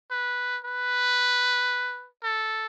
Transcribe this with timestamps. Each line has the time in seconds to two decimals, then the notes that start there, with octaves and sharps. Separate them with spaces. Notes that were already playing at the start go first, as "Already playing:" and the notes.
0.11 B4
0.64 B4
2.24 A4